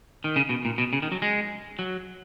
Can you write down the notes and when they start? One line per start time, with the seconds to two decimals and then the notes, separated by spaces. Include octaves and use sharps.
0.24 D#3
0.36 C#3
0.49 B2
0.65 A#2
0.78 B2
0.93 C#3
1.02 D#3
1.12 F#3
1.22 G#3
1.79 F#3